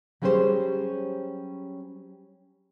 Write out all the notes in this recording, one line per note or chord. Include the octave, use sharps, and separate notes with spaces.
F#3 G3 C#4 G4 G#4 C5